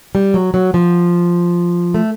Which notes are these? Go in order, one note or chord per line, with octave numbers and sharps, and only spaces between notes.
G3
F#3
F#3
F3
A3